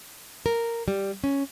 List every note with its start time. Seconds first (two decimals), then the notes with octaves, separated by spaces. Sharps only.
0.46 A#4
0.88 G3
1.24 C#4